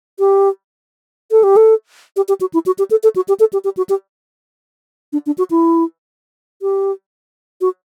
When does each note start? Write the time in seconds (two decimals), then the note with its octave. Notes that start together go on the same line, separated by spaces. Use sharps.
0.19 G4
1.31 A4
1.43 G4
1.56 A4
2.16 G4
2.29 G4
2.41 F#4
2.54 E4
2.66 F#4
2.78 G4
2.91 A4
3.03 A4
3.16 F#4
3.28 G4
3.40 A4
3.53 G4
3.64 G4
3.77 F#4
3.89 G4
5.13 D4
5.26 D4
5.38 F#4
5.51 E4
6.62 G4
7.61 F#4